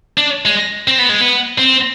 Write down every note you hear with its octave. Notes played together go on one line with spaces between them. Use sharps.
D4
G#3
C4
B3
G#3
B3
C4